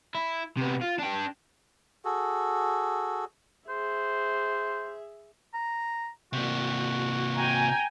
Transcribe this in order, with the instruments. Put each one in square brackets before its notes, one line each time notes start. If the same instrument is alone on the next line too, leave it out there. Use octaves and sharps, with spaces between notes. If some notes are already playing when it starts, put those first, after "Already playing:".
[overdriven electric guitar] E4
C3 B3
F4
D4 G5
[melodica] F#4 G#4 A4
[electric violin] G#4 E5 [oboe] C5
[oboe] A#5
[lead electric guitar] C3 A#3 [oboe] F#4
[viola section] G5 G#5 A#5